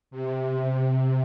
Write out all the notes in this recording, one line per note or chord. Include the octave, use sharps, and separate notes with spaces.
C3